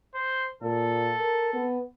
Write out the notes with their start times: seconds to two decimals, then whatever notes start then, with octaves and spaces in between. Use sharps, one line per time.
0.15 C5
0.62 A#2 A4
1.20 A#4
1.53 B3